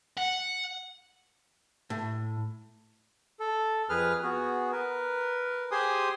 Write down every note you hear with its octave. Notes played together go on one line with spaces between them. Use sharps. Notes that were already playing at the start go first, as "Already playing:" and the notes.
F#5
A2
A4
F2 G#4 B4 F6
B3 F#4 G#4
A#4 B4
G4 G#4 C5 G#5 C6 D#6